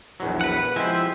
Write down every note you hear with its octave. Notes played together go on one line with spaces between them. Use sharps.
A#1 E2 F#3
B4 F#5
F3 G#3 C4 E4 G4